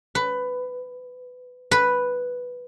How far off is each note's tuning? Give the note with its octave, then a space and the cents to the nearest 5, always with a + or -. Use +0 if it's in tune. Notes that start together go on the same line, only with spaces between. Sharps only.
B4 +15
B4 +0